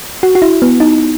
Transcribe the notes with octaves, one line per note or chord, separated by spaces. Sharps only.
F#4
F#4
E4
B3
D#4